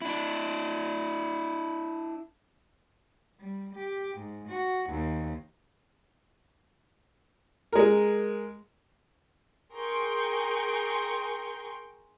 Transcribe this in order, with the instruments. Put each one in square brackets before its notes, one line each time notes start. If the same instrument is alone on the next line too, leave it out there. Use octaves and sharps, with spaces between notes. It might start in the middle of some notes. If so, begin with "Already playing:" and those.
[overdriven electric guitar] D4 E4
[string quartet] G3
G4
G#2
F#4
D#2
[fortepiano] G#3 A#4
[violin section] G#4 A#4 G5 C6 C#6 G6